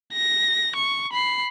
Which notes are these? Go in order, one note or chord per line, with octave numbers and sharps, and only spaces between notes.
A#6
C#6
B5 C7